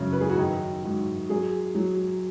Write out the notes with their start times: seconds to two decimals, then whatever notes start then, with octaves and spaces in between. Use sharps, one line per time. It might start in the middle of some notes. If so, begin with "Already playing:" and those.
Already playing: F#2 C#3
0.13 B4
0.21 G#4
0.30 F#4
0.37 D#3 D#4
0.83 G#2 F#4
1.29 F#3 G#4
1.75 F#3